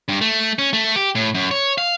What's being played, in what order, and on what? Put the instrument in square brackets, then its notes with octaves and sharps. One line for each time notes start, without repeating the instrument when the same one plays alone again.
[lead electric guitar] G2
A3
C#4
A3
G4
A2
F#2
C#5
F5